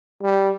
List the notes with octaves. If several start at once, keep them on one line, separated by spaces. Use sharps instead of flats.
G3